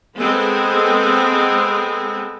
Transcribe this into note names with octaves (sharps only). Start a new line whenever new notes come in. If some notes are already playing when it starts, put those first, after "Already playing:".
G#3 B3 C4 A4